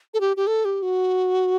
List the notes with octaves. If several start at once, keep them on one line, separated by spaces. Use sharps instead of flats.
A4
G4
G4
A4
G4
F#4